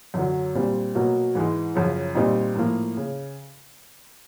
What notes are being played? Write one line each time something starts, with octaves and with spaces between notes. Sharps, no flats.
F#2 D3 F#3
A#2 G3 C4
B2 F#3 A#3
G#2 E3 G#3
F#2 C#3 F3
A#2 G3 C4 D#4
A2 F3 A#3
C#3